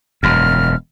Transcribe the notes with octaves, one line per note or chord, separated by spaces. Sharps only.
E1 F#2 F6